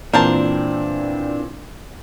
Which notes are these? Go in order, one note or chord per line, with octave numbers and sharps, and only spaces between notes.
A#2 E3 C4 D4 A#4 C5 A5